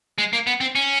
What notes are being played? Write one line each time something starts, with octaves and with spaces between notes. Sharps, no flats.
G#3
A#3
B3
C4
C#4